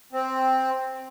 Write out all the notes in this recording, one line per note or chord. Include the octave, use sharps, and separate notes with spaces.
C4